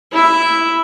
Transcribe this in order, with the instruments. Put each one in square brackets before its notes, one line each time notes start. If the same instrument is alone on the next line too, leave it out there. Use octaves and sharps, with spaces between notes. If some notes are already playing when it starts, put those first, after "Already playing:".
[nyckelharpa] E4 E5